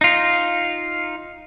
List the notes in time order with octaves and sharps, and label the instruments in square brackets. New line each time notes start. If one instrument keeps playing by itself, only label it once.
[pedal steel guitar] D#4 F4